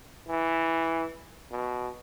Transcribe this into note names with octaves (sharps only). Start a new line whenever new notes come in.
E3
B2